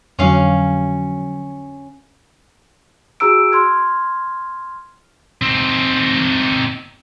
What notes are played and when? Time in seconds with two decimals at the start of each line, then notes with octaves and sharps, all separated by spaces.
0.19 F2 D3 F#3 C#4 F5
3.20 F#4 G#4 A#5 E6 D7
3.52 C6 F6 G#6
5.42 C4 D#4